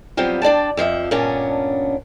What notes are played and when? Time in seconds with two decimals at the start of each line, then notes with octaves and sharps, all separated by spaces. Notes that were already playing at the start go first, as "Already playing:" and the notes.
0.17 F#3 G3 B3 C4 F4
0.42 D4 D5 G5 A5
0.77 F2 F3 A4 E5
1.11 G2 A#2 B3 C#4 D4